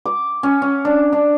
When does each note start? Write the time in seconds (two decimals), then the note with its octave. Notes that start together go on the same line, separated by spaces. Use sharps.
0.06 D6
0.43 C#4
0.62 C#4
0.85 D4
1.13 D4